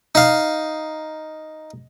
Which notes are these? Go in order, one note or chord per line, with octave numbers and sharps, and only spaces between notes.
D#4 F5